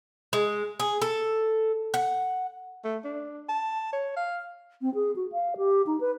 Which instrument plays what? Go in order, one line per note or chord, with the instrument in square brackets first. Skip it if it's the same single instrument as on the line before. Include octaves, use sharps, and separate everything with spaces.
[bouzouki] G#3
G#4
A4
F#5
[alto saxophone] A3
D4
A5
C#5
F5
[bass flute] C4
G#4
F#4
F5
G4
D#4
B4